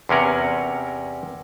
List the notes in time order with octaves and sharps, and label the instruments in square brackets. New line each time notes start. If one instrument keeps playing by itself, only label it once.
[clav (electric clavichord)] E2 C3 C#4 A#4 F#5